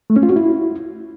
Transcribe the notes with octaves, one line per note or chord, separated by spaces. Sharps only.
A3
C#4
F4
F#4
E4